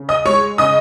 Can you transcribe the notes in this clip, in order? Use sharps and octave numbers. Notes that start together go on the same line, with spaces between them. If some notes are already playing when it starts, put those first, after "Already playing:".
Already playing: C#3
D#5 D#6
G#3 C#5 C#6
C#3 D#5 D#6